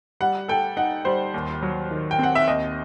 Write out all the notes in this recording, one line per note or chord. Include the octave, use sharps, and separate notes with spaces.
G3 F#5
A4 G5
D#4 F#5
G3 C5
D#2
F#3
D#3
G5
C4 F#5
E5
D#2 D#5